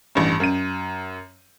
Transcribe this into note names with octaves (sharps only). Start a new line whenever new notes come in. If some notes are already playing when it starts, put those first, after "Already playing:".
A1 G2
F#2 D#7